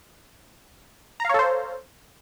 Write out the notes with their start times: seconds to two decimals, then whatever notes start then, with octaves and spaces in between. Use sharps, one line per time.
1.20 A#5
1.25 F5
1.29 C#5
1.34 A4
1.39 C5